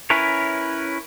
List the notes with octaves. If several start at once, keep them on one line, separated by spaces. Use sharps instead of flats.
C#4 E4 A#4 B4 C#5